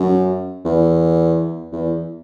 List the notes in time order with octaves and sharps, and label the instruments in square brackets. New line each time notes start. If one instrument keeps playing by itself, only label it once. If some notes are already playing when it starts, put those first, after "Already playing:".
Already playing: [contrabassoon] F#2
E2
E2